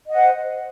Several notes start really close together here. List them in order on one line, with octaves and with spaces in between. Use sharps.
D#5 F#5 C5